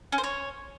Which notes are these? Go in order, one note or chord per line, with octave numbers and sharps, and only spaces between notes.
C#4
C5
C#5